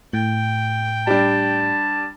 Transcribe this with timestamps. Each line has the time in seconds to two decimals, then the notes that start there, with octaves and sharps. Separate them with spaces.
0.13 A2 G5
1.07 G3 D4 A5